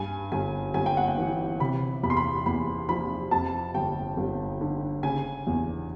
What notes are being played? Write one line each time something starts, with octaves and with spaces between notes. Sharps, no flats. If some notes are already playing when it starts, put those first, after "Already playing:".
Already playing: G2 G#5
G1 G#5
G1 G#5
G5
F#5
G5
E3
C3 B5
E2 B5
C6
B5
E2 B5
F3 B5
F2 A5
G1 G5
G1
D3
C#3 G#5
E2